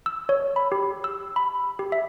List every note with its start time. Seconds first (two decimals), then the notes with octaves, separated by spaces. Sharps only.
0.06 E6
0.29 C#5
0.56 B5
0.72 G4
1.04 E6
1.36 B5
1.79 G4
1.92 E5